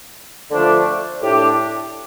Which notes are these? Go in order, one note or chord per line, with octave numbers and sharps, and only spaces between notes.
D3 F3 A3 D4
A2 A3 D4 G4